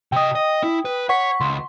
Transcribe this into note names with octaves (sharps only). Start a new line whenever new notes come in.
C3 D#5 G5 D#6
D#5
E4
B4
C#5 F#5 C#6 B6
C#2 C6